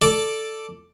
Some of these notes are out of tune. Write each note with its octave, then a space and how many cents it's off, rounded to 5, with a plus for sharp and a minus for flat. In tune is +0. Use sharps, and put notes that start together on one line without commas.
A4 +0 D5 +5 D6 +0